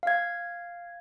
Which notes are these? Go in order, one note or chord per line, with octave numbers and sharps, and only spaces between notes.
F5 G#6